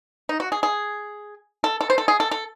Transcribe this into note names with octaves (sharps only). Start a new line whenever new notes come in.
D#4
F#4
G#4
G#4
A4
A4
C5
A4
G#4
A4
A4